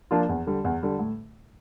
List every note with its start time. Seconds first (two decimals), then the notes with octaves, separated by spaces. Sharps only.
0.11 F3 A#3 D4 F4
0.29 E2
0.47 D3 G3
0.64 E2
0.83 D3 G3
0.99 A2